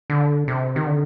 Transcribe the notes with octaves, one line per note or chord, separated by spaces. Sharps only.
D3
C3
D#3
D3